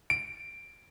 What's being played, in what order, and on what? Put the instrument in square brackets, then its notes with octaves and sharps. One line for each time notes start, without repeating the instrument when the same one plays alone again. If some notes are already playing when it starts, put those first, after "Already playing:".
[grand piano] D7